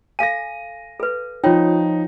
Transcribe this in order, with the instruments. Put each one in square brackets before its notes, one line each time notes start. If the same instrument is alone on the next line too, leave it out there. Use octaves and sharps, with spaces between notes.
[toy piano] A4 F5 G#5 [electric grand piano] A#6 D#7
[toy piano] A4 B4
[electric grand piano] F3 D#4 [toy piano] F4 C#5 G5